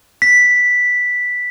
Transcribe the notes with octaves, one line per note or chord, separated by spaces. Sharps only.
B6